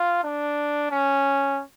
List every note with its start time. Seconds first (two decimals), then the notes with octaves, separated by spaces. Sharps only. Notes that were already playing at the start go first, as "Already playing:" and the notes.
Already playing: F4
0.24 D4
0.91 C#4